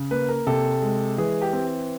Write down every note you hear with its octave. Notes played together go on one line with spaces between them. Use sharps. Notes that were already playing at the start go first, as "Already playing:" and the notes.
Already playing: C#3
A#3 B4
A#4
C3 A4
G#3
E3 G#4
G4
C4